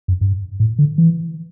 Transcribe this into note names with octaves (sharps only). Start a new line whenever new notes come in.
F#2
G2
A2
D3
E3